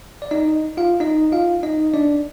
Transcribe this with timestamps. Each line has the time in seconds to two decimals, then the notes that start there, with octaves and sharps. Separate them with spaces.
0.22 D5
0.31 D#4 D#5
0.77 F4 F5
1.00 D#4 D#5
1.32 F4 F5
1.63 D#4 D#5
1.94 D4 D5